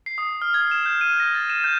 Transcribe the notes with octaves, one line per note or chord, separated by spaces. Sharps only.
C7
D#6
F6
G#6
E7
G6
D#7
A#6
A6
E7
G6